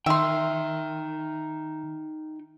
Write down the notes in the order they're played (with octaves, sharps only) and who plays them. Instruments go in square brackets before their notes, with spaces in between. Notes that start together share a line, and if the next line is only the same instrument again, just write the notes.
[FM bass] D#3 [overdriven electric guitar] D#4 G5 [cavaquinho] E5 C6